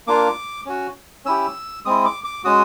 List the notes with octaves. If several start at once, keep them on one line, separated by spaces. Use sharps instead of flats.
A#3 D4 F4 D6
C#4 F#4
C#4 E4 G4 E6
G#3 C4 E4 D#6
D6
D6
G#3 C#4 F#4 D#6